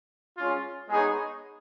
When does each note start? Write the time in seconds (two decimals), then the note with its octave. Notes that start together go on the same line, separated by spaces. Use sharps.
0.37 G#3 C#4 F4
0.89 G#3 B3 D#4 G#4 C#5